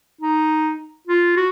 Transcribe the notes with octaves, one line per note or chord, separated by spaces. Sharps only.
D#4
F4
F#4